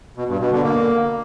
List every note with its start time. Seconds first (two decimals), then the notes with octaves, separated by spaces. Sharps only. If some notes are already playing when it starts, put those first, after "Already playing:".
0.17 B2
0.29 G2
0.40 B2
0.52 D3
0.63 A#3